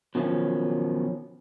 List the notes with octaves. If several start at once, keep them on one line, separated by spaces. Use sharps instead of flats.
B2 D#3 F3 F#3 C#4